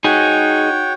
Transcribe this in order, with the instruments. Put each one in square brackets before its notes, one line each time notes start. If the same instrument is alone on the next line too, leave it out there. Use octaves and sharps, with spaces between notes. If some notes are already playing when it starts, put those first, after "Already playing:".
[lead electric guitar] D#4 G#4 [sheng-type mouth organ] F#4 C#5 G5